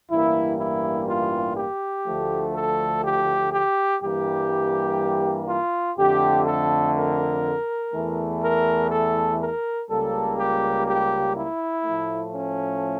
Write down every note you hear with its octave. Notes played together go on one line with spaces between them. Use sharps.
A1 G2 E3 G3 A#3 E4
E4
F4
G4
D2 D3 F3 A3
A4
G4
G4
G2 E3 G3 A#3 G4
F4
F2 D3 A3 G4
A4
A#4
E2 E3 A3
A#4
A4
A#4
C#2 C#3 G3 A#3 A4
G4
G4
E4
A2 F3 A3
C#4